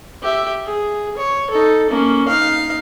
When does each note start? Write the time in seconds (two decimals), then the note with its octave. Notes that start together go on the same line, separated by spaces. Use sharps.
0.22 G4 E5
0.66 G#4
1.17 C#5
1.50 D#4 A4
1.90 A#3 C#4
2.28 D#4 F5